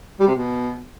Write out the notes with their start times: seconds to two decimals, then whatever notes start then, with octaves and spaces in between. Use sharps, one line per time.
0.20 G3
0.27 C3
0.35 B2